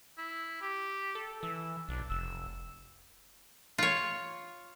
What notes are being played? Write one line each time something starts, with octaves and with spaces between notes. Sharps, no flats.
E4
G4
A4
E3 E6
B1 D4
F1 E6
F4 C#5